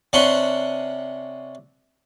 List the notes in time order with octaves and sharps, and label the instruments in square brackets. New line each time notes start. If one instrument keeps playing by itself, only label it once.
[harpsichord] C3 C#4 D4 F#5 C6